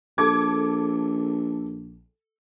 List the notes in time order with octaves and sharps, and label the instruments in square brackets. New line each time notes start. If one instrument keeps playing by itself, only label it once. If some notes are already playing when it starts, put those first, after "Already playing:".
[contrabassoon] A#1 [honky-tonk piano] A4 D6 G#6